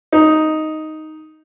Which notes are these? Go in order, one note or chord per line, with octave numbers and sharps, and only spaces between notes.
D#4